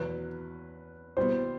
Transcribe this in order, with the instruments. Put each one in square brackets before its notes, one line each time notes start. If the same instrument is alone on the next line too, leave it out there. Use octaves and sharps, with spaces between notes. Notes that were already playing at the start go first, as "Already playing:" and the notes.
Already playing: [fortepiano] E2 B2 F#3 [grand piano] B4
[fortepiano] B2 G3 B3 E4 [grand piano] C5